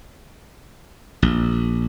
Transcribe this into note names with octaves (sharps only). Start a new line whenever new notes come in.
A#1